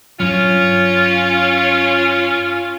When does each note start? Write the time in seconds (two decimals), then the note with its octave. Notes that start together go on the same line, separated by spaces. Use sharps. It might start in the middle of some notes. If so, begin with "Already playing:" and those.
0.20 G2 F#3 C#4 F4